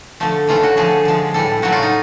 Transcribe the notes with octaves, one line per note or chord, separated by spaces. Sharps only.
D3 F3 A3
C#3 E3 A3 F4
F#4
D3 F3 A3 G#4
D3 F3 G#3
A2 E3 G3 A4
C#3 F#3 A3 F#4
F4
D#4